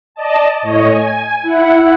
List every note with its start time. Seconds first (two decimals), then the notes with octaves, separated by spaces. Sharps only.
0.15 D5 D#5 A5
0.61 A2 C#5 D#5
0.90 G#5
1.43 E4 F#5